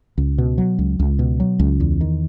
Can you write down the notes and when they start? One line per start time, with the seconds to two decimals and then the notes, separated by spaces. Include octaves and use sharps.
0.18 C#2
0.38 B2
0.58 F#3
0.79 C#2
0.99 C#2
1.19 B2
1.40 F#3
1.59 C#2
1.80 E2
2.01 D#3